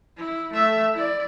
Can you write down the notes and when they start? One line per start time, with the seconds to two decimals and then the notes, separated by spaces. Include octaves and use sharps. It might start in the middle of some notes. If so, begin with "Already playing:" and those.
0.17 E4
0.54 A3 E5
0.93 E4 D5